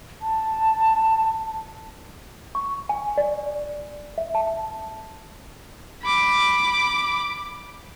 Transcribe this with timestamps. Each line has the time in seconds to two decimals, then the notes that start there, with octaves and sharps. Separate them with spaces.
0.22 A5
2.55 C#6
2.89 G#5
3.17 D5
4.18 E5
4.35 A5
6.03 B5 D6